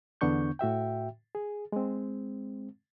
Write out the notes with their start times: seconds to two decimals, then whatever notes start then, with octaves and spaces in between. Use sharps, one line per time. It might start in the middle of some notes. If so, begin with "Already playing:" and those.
0.21 E2 D3 B3 D4 C#6 G6
0.59 A2 F#4 E5 G5
1.35 G#4
1.72 G#3 C4